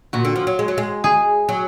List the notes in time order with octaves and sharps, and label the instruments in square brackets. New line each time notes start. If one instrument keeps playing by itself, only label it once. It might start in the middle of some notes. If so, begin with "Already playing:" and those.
[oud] A#2 [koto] F#4
[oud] D3
F3
F#3
G#3
F#3
G#3
[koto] G#4
[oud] F#3